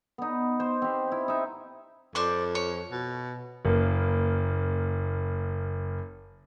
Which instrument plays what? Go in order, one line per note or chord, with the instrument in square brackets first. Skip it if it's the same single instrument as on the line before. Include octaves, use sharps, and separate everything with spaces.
[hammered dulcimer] B3 D#4
C5
C4 G4
E4
D#4 E5
[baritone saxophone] F2 [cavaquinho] C5 D5 C#6
[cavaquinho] C#5
[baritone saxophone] B2
[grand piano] F#1 A#3 B4